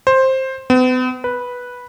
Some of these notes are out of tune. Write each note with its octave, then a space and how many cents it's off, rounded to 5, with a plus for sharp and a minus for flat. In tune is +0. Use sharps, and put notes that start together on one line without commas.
C5 +10
B3 +45
B4 -5